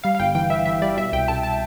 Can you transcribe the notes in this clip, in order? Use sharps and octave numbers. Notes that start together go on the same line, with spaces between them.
G3 F5
F5
G1 G5
E3 G5
E3 E5
E3 E5
G3 D5
B2 E5
C2 G5
C2 A5
A5